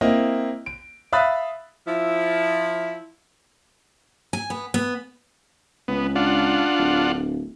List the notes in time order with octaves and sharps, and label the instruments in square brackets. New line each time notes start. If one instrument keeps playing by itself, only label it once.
[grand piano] A#3 C4 E4 D#5
D7
E5 F5 B5 D#6 F#6 A6
[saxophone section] F3 E4
[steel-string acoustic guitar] G#5
B3
B3
[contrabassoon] C#2 [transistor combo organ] B3
[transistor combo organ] D4 F4 F#5
[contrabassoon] D1